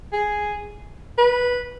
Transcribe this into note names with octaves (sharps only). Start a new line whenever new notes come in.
G#4
B4